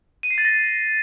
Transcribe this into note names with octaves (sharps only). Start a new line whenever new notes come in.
D#7
C7
A6
A#6